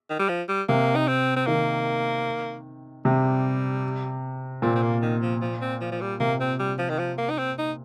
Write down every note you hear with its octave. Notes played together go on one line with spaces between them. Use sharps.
D#3
G3
F3
G3
C3 A#3
D#4
C4
C4
D#3 A#3
C3 G3
A#2 C4
C4
A#3
D#3
F3
F3
C4
F3
F3
G3
C3 A#3
C4
G3
F3
D#3
F3
A#3
D#4
C4
D#4